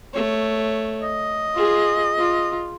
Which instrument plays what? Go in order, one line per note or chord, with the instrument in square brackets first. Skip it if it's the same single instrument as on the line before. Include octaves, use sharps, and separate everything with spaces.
[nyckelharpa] A3 C#5
[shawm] D#5
[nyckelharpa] F4 G#4
F4